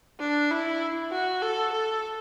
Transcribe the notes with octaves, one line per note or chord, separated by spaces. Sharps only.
D4
E4
F#4
A4
A4